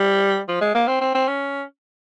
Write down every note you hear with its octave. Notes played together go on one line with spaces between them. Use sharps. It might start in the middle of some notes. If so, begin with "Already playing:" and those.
Already playing: G3
F3
G#3
A#3
C4
C4
C4
C#4